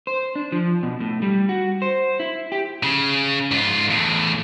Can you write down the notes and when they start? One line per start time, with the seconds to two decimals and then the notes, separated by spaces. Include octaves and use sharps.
0.07 C5
0.36 D4
0.52 F3
0.83 B2
1.00 A2
1.22 G3
1.49 F#4
1.82 C5
2.20 E4
2.52 G4
2.83 C#3
3.52 G#2 F4
3.90 E2 A2